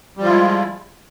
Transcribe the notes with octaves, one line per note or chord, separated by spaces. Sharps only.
F3 G3 G#3 E4 F4